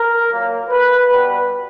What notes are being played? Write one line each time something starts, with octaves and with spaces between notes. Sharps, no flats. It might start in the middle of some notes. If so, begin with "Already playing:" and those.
Already playing: A#4
A#2 F#3 A#3
B4
B2 G3 B3 B4